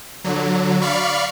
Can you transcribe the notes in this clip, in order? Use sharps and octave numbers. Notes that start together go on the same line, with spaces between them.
D3 F#3
D5 F5 B5 C#6